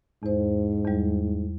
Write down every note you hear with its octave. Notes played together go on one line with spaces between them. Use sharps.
E2 G#2 C5
E2 G3